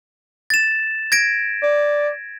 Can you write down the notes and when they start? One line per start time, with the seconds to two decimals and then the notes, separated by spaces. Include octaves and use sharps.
0.50 A6 E7
1.12 G#6 A#6 D7
1.63 D5